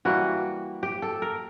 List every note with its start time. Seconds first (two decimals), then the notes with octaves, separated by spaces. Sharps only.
0.05 E3 G3 A#3 F#4
0.83 G4
1.02 A4
1.22 A#4